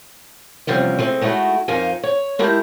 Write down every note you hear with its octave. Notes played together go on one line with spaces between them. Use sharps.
E2 G2 C3 F3 G3 C#4
G#3 A3 C4
G#3 A3 B3 D#4 E4 F#4
F2 D#4 A#4 F5 G#5
C#5
G#3 A3 E4 G4 A#4